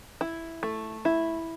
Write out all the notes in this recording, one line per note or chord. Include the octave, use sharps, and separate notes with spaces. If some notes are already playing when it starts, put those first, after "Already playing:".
E4
A3
E4